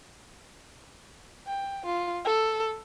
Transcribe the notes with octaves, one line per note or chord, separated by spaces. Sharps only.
G5
F4
A4